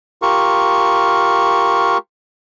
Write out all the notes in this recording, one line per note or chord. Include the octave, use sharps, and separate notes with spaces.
F4 G4 A#4 C#6